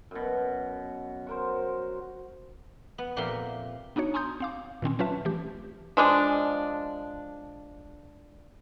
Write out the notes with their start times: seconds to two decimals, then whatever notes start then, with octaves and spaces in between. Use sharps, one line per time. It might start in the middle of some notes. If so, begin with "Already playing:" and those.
0.11 F#2 B2
1.27 F#4 A#4 C5
2.98 B3
3.16 F2 A#2 G4 A#4 E5 C6
3.96 B3 D4 D#4 F#4 C#5
4.14 G#5 A#5 C6 D#6 G6
4.40 C4 F5 D6
4.82 A#2 D#3 C4 C#4
4.99 F#3 C#4 F4 B4 E5 A5
5.25 E3 A3 G4
5.97 F3 G#3 D4